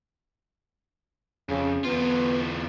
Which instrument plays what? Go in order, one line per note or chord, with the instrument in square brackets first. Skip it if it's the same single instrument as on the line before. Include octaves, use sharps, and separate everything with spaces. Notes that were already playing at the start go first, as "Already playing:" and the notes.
[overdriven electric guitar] F2 [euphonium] C#3
[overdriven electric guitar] E2 F4 [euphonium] B3